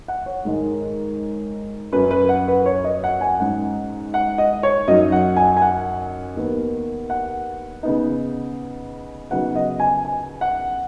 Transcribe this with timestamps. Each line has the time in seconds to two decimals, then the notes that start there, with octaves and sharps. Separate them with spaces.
0.08 F#5
0.26 C#5
0.45 G#2 D#3 G#3
1.92 F#2 F#3 C#4 B4
2.11 B4
2.29 F#5
2.48 B4
2.66 C#5
2.84 D#5
3.04 F#5
3.21 G#5
3.40 G#2 G#3 C#4 F#5
4.14 F#5
4.38 D#5
4.63 C#5
4.88 F#2 F#3 D#4 D#5
5.12 F#5
5.37 G#5
5.57 G#5
5.62 F#5
6.35 D#2 D#3 B3
7.10 F#5
7.83 C#3 B3 D#4
9.31 C#3 F#3 B3 D#4 F#5
9.56 D#5
9.80 G#5
10.05 G#5
10.41 F#5